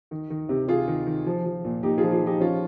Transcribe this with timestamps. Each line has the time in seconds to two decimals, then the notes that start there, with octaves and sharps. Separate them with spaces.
0.11 D#3
0.30 D#3
0.49 C3
0.68 C3 F4 G#4
0.87 D#3
1.06 D#3
1.26 F3
1.45 F3
1.65 A#2
1.83 A#2 D#4 G4
1.98 F4 G#4
2.03 F3
2.12 F4 G#4
2.22 F3 D#4 G4
2.40 F3 C#4 F4